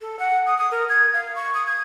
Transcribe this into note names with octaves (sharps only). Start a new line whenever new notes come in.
A4
F#5
D#6
D#6
A#4
G#6
F5
C#6
D#6
G#6